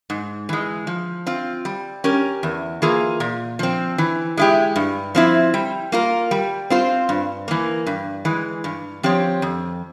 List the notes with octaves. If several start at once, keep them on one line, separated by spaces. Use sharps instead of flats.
G#2
E3 G#3
F3
C4 F4
G3
C#4 G4 A#4
E2
E3 A#3 F4 G#4
A#2
F3 C4
E3
G#3 E4 G4
G2
F3 C4 E4
G3
A#3 F4 A#4
G3
C4 F4 C5
G2
E3 A#3
G2
E3 G#3
G2
F3 C4 G4 C#5
F2